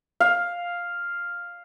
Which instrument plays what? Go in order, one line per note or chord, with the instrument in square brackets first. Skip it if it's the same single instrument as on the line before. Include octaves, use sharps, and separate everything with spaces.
[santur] F5